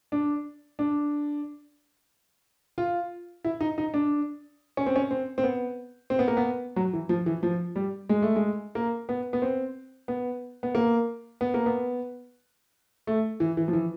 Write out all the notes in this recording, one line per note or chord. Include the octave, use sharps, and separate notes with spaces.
D4
D4
F4
E4
D#4
D#4
D4
C#4
C4
C#4
C4
C4
B3
C4
B3
A#3
B3
F#3
E3
F3
E3
F3
G3
G#3
A3
G#3
A#3
B3
B3
C4
B3
B3
A#3
B3
A#3
B3
A3
E3
E3
F3
E3